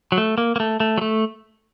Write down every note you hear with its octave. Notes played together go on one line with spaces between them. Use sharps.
F#3
A3
A#3
A#3
A3
A3
F#3
A3